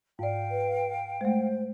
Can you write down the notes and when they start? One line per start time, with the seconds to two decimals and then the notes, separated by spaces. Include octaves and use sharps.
0.19 G#2 D5 F5 G5
0.51 B4
1.21 G#3 A3 C5